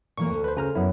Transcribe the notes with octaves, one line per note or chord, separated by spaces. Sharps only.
A#2 E3 A#3 C#6
D2
B4 C5
C#3 C5 G#5 A#5 F6
F#2 B3 E4